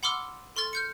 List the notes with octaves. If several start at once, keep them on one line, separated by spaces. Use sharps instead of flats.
F#5 B5 C6 D6 E6 F6
A4 C6 C#6 F6 A6
F6 G6 C#7